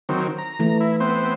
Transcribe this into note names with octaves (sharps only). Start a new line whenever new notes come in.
D#3 F#3 C4
A#5
E3 A3
E4
B3 C4 C5